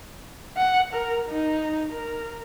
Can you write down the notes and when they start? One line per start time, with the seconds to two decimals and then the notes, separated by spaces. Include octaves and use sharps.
0.57 F#5
0.93 A#4
1.30 D#4
1.93 A#4